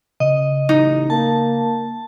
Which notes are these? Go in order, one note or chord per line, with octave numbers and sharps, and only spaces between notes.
C#3 D#5
A1 D#4
A#3 A5